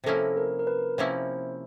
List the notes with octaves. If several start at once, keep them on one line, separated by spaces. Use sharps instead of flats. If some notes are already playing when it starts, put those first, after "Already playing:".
C3 F3 A#3 C#4 E4 A4
A#4
A#4
B4
C3 F3 A#3 C#4 E4 C5